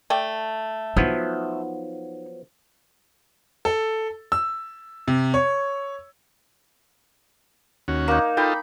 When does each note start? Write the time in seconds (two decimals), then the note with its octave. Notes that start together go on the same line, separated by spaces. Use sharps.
0.10 A3 D5 G5
0.96 F3 F#3 B3 D#4
3.65 A4
4.32 E6
5.08 C3
5.34 C#5
7.88 D#2 C#4 F#4
8.08 A#3 D#4
8.37 D#4 F4 A4 G5 B5